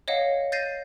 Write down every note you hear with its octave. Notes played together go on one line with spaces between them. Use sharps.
C#5 D#5 F5 F#5
G6 A6 A#6 C7 D#7